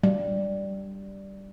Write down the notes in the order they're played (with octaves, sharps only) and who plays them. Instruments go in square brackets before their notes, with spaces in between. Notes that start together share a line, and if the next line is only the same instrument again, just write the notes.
[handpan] G3